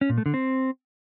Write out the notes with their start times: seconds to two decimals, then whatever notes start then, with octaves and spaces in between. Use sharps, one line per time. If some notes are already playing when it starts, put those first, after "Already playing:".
0.01 C#4
0.09 A#2
0.18 A3
0.26 D3
0.34 C4